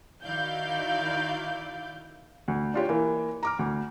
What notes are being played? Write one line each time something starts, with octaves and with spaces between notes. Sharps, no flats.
D#3 E4 F#4 D5 F5 G6
D2
D4 F4 G4 C#5
E3 A#3
A#5 D6 F6
D2